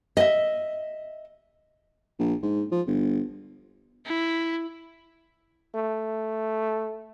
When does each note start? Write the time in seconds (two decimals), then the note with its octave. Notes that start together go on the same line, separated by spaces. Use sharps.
0.17 D#5 E5
2.19 A#1
2.42 G#2
2.71 F3
2.86 G1
4.06 E4
5.75 A3